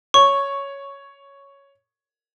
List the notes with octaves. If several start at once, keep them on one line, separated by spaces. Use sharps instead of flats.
C#5 C#6